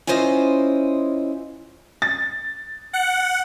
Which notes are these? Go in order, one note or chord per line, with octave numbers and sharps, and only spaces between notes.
C#4 E4 F4 C5 D#5
A6
F#5